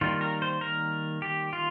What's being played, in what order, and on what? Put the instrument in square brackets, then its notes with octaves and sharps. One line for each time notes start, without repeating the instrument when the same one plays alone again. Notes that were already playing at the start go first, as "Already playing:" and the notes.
[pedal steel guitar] D#3 G3 A#3 F4
A#4
C5
A#4
G4
F4